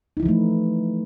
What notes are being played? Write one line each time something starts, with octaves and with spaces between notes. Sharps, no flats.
E3 F3 A3 D#4 E4